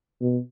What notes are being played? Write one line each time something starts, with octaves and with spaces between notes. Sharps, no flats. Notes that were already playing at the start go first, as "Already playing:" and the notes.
B2